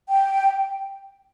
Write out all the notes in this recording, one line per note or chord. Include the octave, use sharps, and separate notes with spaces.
G5